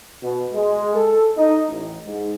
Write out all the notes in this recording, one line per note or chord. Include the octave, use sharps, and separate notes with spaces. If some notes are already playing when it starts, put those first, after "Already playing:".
B2
G#3
A4
D#4
A1
G#2